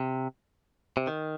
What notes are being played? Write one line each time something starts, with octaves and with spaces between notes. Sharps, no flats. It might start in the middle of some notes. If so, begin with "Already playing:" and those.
Already playing: C3
C3
D#3